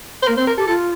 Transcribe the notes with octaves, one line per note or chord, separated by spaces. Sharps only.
C5
A#3 A#4
C4 C5
A#4
G4 A4
F4 A4